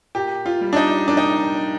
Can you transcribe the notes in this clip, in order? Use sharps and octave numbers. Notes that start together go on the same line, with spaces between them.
A#2 G4
F4
G3
D4
D#4
A#2 D4
D#4